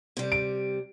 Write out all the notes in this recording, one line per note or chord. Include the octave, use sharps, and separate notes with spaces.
C3 G3
D7